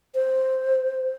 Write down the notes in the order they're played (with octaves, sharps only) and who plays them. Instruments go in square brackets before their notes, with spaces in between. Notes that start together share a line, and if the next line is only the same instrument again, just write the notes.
[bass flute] C5